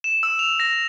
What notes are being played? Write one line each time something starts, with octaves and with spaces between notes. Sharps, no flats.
E7
E6
F7
A#6